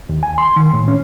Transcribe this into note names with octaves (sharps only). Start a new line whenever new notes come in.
D#2
G#5
C6
D#3
A2
C#4